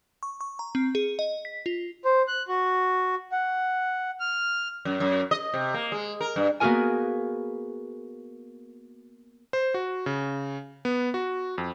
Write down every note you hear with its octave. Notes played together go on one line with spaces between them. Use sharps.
C#6
C#6
A#5
C4
G#4
D#5
B6
F4
C5
F#6
F#4
F#5
F6
F#2
F#2
D#5
C3
A#3
G#3
A#4
G2
A#3 B3 F#4 G#4 A#4 G#5
C5
F#4
C#3
B3
F#4
F2